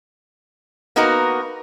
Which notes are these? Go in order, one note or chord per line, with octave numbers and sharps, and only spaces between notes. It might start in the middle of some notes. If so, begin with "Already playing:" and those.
A#3 B3 D#4 F#4 A#4 B4